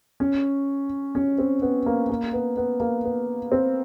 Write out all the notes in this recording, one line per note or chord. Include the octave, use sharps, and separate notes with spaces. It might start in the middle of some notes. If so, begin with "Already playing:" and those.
C#4
C#4
C4
B3
A#3
A#3
B3
B3
A#3
B3
C4